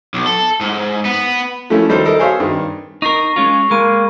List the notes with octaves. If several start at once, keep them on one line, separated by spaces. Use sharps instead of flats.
B1
A4
G#2
B3
F3 A3 A#3 C#4 E4
D#3 G3 A4 C5
A4 A#4 D#5
G#4 C5 C#5 E5 F5
G2 D#3
D#4 A#4 C#6 A#6 C7
G#3 C#4 F4 C#6
G#3 A#3 B5 D#7